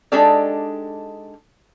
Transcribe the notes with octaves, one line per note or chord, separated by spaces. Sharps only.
G#3 D4 D#4 G4 A4 D5